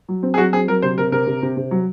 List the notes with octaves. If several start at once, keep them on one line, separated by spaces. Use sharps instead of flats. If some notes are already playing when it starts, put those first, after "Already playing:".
F#3
C4
G#4
F#3 F#4
C4 G#4
F#3 A#4
C3 C5
C3 A#4
C3 A#4
C3
C3
C3
F#3